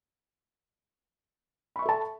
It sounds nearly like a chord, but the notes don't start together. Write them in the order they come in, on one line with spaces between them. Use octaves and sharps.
B5 C#6 E5 A4 A5